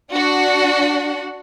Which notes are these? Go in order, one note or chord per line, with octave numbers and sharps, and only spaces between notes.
D4 F#4 F#5